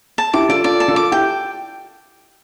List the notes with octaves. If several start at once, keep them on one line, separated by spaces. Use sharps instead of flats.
A5
E4 G4 D6
F4 A4 D5
F4 A4 D5
A5
F4 A4
D6
E4 G4 G5